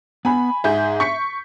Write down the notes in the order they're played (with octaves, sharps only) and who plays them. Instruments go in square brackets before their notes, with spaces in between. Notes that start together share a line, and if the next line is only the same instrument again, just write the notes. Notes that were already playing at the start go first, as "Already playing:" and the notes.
[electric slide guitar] B3 [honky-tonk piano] G#5 B5
[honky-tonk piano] G#2 G#4 G6 [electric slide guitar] E5
[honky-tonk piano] C#6 B6 C#7